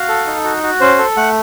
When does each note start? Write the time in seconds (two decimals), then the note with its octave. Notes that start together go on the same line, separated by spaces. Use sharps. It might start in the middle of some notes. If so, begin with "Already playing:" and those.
Already playing: F#4 F5
0.08 A4
0.27 D#4
0.44 F#4
0.63 F#4
0.81 C#4 C5
0.98 A4
1.17 A3 F#5